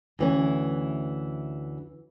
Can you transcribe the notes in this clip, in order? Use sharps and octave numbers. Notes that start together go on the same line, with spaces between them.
D2 E3 C#4